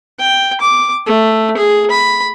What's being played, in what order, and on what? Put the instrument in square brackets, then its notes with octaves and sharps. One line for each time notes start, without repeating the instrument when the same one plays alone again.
[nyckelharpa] G5
D6
A3
G#4
B5